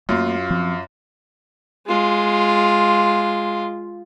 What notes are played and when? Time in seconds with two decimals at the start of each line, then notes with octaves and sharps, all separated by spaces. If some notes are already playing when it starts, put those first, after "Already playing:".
0.09 F#2 A3 A#3 F4
0.50 F3 C4
1.87 G#3 F4